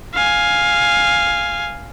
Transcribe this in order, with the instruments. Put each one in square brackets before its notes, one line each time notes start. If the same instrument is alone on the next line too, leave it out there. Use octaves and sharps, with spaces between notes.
[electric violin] F5 G#5